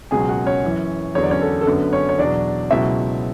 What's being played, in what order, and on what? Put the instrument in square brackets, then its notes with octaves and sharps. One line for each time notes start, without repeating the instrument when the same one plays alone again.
[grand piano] C#2 B2 F#3 G#4 G#5
F#4 F#5
C#4 C#5
F#2 E3
E2 D3 F#3 C#5
D5
C#4 C#5
A4
A4
F#2 D3 F#3 B3 B4
C#4 C#5
C#5
E2 B2 F#3 D4 D5
C#2 B2 F#3 E4 E5